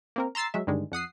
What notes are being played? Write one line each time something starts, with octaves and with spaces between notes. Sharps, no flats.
A#3 C4 A#4
A#5 C6 E6 A6 C7
F#3 G#3 E5
G2 D3 D#3 G3 G#3
F2 F#5 D#6 C7